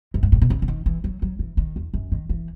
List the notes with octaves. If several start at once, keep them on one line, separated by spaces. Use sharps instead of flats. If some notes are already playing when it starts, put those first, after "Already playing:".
F#2
G#2
A2
B2
C#3
C#3
D#3
E3
F#3
F#3
E3
D#3
E2
F#2
D#3
E3